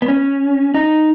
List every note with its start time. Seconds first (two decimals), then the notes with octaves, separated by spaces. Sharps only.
0.02 B3
0.08 C#4
0.74 D#4